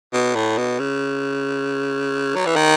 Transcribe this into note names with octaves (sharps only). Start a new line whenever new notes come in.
B2
A2
B2
C#3
F#3
E3
D#3